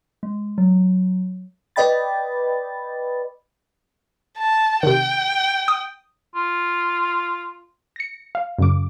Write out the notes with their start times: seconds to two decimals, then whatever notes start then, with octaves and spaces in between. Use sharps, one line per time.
0.23 G#3
0.58 F#3
1.76 B4 D5 D#5 G5 B5 A6
4.38 A5
4.83 C3 D#3 G5
5.68 D#6
6.35 F4
7.96 A#6 C#7
8.35 F5
8.59 F#2 C#3 D6